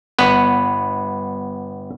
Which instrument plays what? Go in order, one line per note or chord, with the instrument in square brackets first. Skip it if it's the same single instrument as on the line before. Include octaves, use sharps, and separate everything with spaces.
[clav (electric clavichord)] G1 B3 B4